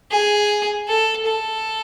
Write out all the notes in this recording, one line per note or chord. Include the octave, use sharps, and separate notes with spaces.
G#4
A4
A4